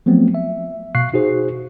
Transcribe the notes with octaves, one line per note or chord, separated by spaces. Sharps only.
F3 F#3 A3 B3 C4
E5
B2 F5 C#6 F#6 C7
D#4 F#4 G#4 C5